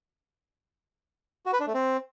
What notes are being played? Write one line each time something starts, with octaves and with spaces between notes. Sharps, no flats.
F#4
B4
D4
A3
C4